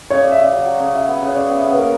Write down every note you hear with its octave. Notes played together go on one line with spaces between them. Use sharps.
C#3 C#5
C#3 D5
E5
C#3 D5
F#3 D5
F#3
C#3
F#3 E5
B3
C#3
C#5
C#3 D5
B3
E5
C#3
B4
A#3 A#4